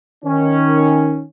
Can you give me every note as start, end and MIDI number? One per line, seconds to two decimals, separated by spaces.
0.25 1.23 51
0.25 1.23 61